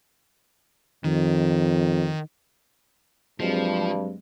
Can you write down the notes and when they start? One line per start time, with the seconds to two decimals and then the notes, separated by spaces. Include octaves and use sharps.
1.04 F2 D#3
3.40 G2 F3 F#3 G#3 C4